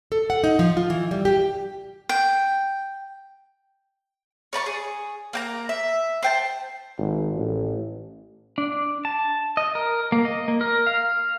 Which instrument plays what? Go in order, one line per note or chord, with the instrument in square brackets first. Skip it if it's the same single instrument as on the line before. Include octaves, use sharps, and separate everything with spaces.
[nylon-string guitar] A4
F#5
D#4
F3
F4
E3
G3
G4
[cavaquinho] G5
[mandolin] C#5 D5 A#5 C#6
G#4
A#3 G5 A#5
E5
C5 G5 A5
[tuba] G#1
A1
[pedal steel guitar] D4
A5
D#5
A#4
A#3
D#5
A#3
A#4
F5